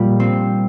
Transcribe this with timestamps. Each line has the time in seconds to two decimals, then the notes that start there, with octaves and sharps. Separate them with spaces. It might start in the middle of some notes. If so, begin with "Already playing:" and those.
Already playing: A#2 G3 A#3
0.20 C4